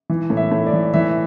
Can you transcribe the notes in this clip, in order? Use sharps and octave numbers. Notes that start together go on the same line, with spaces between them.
E3
A2
E5
A2
D5
E3
E3 E5